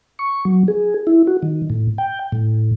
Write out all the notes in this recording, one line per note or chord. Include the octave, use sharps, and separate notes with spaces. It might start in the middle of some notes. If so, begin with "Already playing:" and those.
C#6
F#3
G#4
E4
F#4
D#3
A2
G5
A2